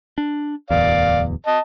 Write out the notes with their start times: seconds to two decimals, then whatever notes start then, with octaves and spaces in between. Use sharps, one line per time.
0.18 D4
0.71 D1 E2 D5 F5
1.47 D#5 A5